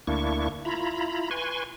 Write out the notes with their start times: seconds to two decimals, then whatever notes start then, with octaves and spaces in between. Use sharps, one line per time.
0.07 D2 A#3 D4 E4 C#6
0.65 E4 F4 A#5 B5
1.31 B4 G#5 C6 C#6